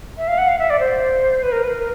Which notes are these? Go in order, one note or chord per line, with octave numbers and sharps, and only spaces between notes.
E5
F5
F#5
F5
E5
D5
C5
B4
A#4
B4
A#4